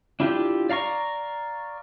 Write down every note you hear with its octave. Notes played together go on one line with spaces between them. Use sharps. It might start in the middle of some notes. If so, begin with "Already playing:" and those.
D4 E4 F4 G4
D5 F5 A#5 C#6